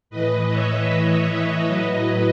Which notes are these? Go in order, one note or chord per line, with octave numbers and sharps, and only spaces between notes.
A2 E3 B4 D#5
C#5 E5
B4 D#5
A2 F#3